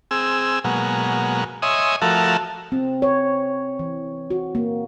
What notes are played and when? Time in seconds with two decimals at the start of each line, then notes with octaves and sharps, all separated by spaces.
0.11 C4 G#4 E6
0.64 B2 F#3 G#3 A#3
1.62 C#5 D#5 E5 G#5 C6 D#6
2.02 F3 A3 F#4 A4 A#4 E5
2.72 C4
3.02 C#5
3.79 E3
4.30 F#4
4.55 A#3